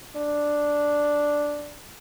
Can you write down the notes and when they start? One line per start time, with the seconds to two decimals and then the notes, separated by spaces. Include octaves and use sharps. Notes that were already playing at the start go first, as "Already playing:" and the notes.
0.16 D4